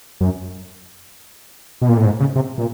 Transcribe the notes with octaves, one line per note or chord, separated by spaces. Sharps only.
F#2
B2
A#2
A2
G#2
C#3
C3
A#2